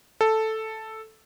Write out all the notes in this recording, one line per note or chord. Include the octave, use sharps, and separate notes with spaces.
A4